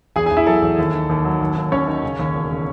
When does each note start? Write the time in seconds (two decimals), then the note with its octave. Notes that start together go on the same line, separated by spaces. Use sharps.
0.16 E2 G#4 G#5
0.26 G#4 G#5
0.31 E2
0.37 E4 E5
0.46 F#3 A4 A5
0.62 E2
0.79 D#2
0.94 D#3
1.09 D#2
1.24 F#3
1.41 D#2
1.56 D#2
1.72 D#2 C#4 C#5
1.87 D#3
2.03 C#3
2.19 D#2
2.34 E1
2.50 C#3